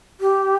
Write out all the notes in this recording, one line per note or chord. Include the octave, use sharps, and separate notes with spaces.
G4